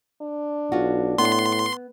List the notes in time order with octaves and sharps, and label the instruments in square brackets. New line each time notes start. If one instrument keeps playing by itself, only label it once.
[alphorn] D4
[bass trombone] B1 [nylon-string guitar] F4 F#4
[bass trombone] A2 [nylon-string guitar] B3 [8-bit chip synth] C6